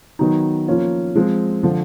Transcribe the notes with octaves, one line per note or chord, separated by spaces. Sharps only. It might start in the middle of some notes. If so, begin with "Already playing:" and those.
D#3 F#3 B3 D#4
F3 A#3 C#4 F4
F3 G#3 C4
D3 F3